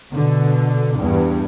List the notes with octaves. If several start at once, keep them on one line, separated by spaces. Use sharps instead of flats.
B2 D3
E2 G2